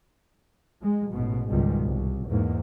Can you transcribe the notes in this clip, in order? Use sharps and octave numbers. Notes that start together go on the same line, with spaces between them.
G#3
A1 G#2 B2
C#2 G#2 B2 D#3 G3 G#3
C2
E2 G#2 A#3